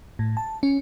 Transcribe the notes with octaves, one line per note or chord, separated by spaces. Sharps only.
A2
A5
C#4